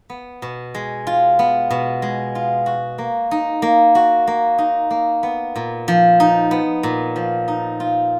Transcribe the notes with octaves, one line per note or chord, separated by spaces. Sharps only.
B3
B2
G#3
F4
B3
B2
G#3
F4
F#4
A#3
D#4
A#3
F#4
A#3
D#4
A#3
B3
A#2
F3
D#4
B3
A#2
F3
D#4
F4